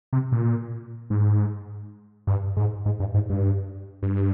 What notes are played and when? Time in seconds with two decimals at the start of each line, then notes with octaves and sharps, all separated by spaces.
0.13 C3
0.32 A#2
1.10 G#2
2.27 G2
2.57 G#2
2.86 G#2
3.00 G2
3.14 G#2
3.30 G2
4.03 G2